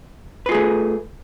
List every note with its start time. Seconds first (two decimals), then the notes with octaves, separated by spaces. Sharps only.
0.46 B4
0.49 F4
0.52 G#4
0.54 A3